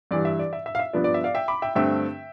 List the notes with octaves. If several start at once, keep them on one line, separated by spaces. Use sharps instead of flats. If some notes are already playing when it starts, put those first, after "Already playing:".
G2 E3 G3 D5
E5
D5
E5
E5
F5
E5
G2 F3 B3 D4 F4 D5
D5
E5
D5 F5
E5 G5
B5 D6
E5 G5
G2 D3 A3 C4 E5 G5